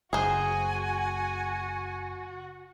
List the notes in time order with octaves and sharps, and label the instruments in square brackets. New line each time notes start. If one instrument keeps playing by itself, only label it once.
[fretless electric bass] F#1 [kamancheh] F#4 [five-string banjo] G#4 C5 [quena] G#5